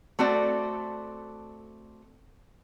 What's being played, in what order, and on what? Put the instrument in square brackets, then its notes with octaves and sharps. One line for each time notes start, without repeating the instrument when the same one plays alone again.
[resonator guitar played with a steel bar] A3 C4 F#4 A4 D5